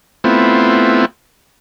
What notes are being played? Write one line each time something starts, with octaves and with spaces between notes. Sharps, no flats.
A3 B3 C4 E4 F4